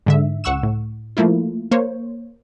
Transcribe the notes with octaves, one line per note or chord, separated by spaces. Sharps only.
G#2 D3 E5
C#2 F#5 C#6 E6 E7
A2
F3 A3 A#3 E4 F4
A#3 C5 C#5